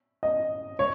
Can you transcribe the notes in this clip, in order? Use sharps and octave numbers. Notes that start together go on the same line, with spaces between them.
D#5
C#5